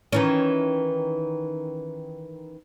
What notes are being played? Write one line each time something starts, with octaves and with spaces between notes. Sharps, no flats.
D#3 E3 C#4